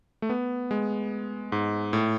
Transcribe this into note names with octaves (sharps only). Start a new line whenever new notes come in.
A3
B3
G#3
G#2
A2